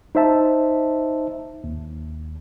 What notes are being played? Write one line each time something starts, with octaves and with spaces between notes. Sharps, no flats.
D#4 C5 E5 A5
D#2